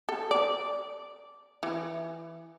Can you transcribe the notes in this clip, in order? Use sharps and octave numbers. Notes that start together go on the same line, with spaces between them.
A4
D5
E3